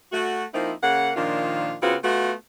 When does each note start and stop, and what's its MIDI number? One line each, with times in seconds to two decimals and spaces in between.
0.13 0.45 57
0.13 0.45 66
0.54 0.73 53
0.54 0.73 58
0.54 0.73 60
0.54 0.73 63
0.54 0.73 64
0.83 1.12 49
0.83 1.12 58
0.83 1.12 78
1.16 1.75 46
1.16 1.75 51
1.16 1.75 53
1.16 1.75 62
1.16 1.75 65
1.82 1.97 49
1.82 1.97 59
1.82 1.97 60
1.82 1.97 65
1.82 1.97 66
2.03 2.33 57
2.03 2.33 59
2.03 2.33 65
2.03 2.33 66